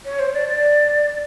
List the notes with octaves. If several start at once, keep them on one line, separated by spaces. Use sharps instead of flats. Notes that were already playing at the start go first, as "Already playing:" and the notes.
C#5
C5
D5
D5